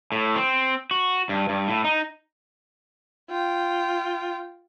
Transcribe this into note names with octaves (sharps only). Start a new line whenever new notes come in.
A2
C4
F#4
G2
G2
A2
D#4
F4 G5